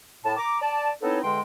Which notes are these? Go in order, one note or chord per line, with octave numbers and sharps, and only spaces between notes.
A2 A5
A#5 D6
D5 A5
B3 C4 D#4 E4 A4 C#5
E2 D3 G#3 G5 C6